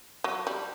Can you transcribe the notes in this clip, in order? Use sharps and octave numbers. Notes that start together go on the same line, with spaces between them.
F#3
G3